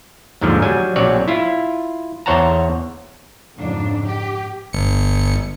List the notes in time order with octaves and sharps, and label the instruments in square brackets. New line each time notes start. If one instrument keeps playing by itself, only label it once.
[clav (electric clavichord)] D#2 G#2 D3 F3
F#3 G3 G#5
A#1 F#3 C4 C#4 C#5 D5
E4 F4
E2 C5 C#5 F#5 A5 A#5
[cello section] F2 G#2 C#3 D4
G4
[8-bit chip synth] G1 C#7